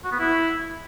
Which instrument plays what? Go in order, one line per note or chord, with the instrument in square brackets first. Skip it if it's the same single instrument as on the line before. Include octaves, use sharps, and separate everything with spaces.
[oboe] F#4
B3
E4